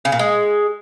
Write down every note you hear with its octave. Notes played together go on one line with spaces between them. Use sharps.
C#3
A#2
G#3